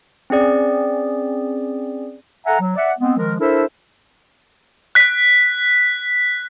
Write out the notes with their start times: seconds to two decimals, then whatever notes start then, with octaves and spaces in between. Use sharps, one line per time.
0.30 C4 C#4 G#4 D5
2.46 A4 E5 F#5 G#5 A#5
2.60 F#3
2.76 D5 E5 F#5
2.99 G#3 B3 C4
3.17 D#3 F3 G#3 A#4
3.39 D4 E4 A4 A#4 C5 E5
4.95 F#6 B6